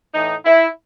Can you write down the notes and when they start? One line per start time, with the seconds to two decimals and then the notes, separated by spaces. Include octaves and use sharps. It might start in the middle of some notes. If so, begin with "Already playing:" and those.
0.14 A2 E3 D#4
0.45 E4